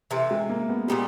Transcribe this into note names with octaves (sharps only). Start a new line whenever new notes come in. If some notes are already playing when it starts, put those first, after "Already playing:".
C3 E3 A3
G#3
A#3
B3
A#2 G3 G#3 B3 D#4